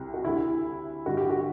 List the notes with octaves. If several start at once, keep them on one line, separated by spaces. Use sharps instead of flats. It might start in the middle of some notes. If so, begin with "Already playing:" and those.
Already playing: C2 C3 G3
F#4
D2 D3 G3 E4
G2 D3 G3 F#4
G4
F#4